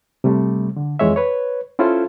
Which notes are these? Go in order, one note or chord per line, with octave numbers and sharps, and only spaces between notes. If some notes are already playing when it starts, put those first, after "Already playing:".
C3 G3 A3
D3
F2 E3 G#3 C#5 E5
B4 C#5
C#4 E4 F4 A4 C5